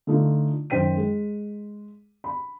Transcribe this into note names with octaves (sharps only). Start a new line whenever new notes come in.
D3 A3 D#4 F4
F#2 D#3 C5 G5 B6 D#7
G#3
B5